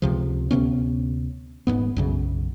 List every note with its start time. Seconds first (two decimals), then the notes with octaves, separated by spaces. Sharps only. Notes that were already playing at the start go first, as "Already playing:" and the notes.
0.02 C#2 C3 F3
0.51 D2 C3 B3 C#4
1.67 D#1 E2 G#2 B3
1.97 B1 F#2 C#3